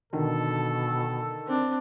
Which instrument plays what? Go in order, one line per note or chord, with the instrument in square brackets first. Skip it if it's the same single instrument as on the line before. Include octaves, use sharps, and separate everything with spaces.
[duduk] B2 [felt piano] D3 D#3 [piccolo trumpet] A4
[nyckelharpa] C4 D4